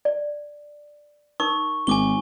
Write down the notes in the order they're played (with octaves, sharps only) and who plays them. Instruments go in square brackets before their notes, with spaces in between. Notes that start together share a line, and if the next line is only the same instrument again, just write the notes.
[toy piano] D5
[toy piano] D#4 A#4 D#6 [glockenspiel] C#6
[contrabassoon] G#1 [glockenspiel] G#5 D6 G7